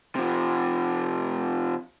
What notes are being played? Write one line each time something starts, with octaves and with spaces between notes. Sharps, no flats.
C3 F3